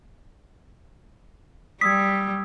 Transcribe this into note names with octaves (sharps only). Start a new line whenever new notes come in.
G3 D#6 E6 G#6 B6